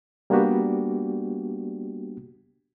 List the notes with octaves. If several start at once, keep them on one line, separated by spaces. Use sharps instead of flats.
G3 A#3 B3 D4 F#4 G4